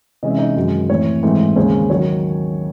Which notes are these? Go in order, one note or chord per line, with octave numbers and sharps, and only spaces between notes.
C3 E3 G#3 C#4 D#5
E5
D#4 D#5
F#2 D#3 G#3
A2 E3 C4 C#5
G#2 E3 A3 C4
D#2 C#3 G#3 C#4 C5
D#3 F#3 C#5